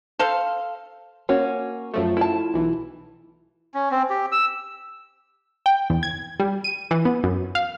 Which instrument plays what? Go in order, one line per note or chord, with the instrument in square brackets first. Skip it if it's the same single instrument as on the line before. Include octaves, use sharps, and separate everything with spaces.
[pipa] A4 C5 F5
[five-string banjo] A#3 C#4 F#4
[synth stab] F#2 F3 A3
[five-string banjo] E4 F4 A5
[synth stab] B1 E3
[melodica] C#4
C4
G4
E6
[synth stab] G5
E2
G#6
G3
D#7
E3
B3
F#2
F5